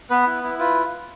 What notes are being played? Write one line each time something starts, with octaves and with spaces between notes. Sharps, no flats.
B3 B4
E4
E4
F4 B4